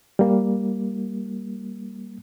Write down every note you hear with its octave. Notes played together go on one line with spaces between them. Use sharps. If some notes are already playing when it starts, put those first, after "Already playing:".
G3 A#3